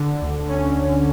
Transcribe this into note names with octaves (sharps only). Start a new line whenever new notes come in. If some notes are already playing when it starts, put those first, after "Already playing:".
Already playing: D3
D2
C#4